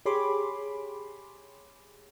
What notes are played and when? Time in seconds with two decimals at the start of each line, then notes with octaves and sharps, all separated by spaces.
0.06 G4 G#4 C#5 B5 C6 D6